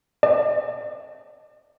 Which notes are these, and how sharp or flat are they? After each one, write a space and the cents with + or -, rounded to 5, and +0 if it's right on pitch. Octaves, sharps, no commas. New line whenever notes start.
D5 +35